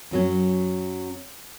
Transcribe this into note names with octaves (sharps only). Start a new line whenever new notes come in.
F#2 F#3 C#4